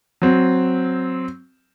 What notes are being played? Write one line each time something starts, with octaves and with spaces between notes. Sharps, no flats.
F#3 C4